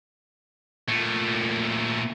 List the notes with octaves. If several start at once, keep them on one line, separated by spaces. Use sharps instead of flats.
A#2 A3